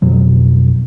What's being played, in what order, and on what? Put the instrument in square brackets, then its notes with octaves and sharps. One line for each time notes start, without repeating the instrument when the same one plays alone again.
[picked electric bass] F2 B2 F#3